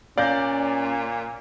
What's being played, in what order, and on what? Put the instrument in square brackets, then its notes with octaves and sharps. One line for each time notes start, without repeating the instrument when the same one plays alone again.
[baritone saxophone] A#2 [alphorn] C#4 [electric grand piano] D5 [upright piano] F5 G6 A#6